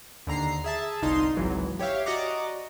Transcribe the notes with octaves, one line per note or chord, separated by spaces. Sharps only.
D#2 D3 A#5 C7
G#4 E5 A5
G1 C2 D#4 F4 C6
G#1 C#2 E3 F#3
G4 C#5 E5 F5
F#4 D5 D#5 F#5 A#5 D6